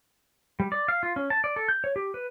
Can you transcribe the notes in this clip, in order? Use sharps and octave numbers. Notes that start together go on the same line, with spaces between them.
G3
D5
F5
F4
C#4
A5
D5
A4
G6
C#5
G4
B4